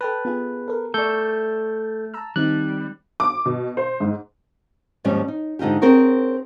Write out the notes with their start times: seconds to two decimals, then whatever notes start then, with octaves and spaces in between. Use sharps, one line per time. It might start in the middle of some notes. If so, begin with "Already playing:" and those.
0.01 A4 B4 G5 A5
0.25 B3 F4 G#4
0.68 A4 A#4
0.94 A3 A4 D5 C#6 G6
2.14 A5 A#5 E6
2.36 D#3 G3 C4 D#4 F#6
3.20 D6
3.46 B2
3.77 C5
4.00 G#2
5.04 D#2 G#2 F3 G3 C#4
5.28 D#4
5.59 G#2 D3 D#4 F4 G4
5.82 C4 G#4 A#4 C5 C#5